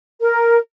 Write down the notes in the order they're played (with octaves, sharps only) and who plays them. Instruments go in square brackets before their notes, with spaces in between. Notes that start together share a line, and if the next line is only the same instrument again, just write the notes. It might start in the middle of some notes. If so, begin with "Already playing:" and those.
[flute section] A#4